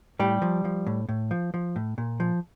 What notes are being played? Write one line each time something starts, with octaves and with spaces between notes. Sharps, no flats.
A2 G3 G4
F3
F3
A2
A2
F3
F3
A2
A#2
F3